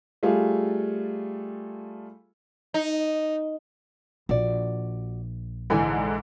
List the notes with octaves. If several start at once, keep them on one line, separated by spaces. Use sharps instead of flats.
G3 A3 F4 G#4 A4 F5
D#4
A#1 F#4 D5
G#2 D3 E3 G5 G#5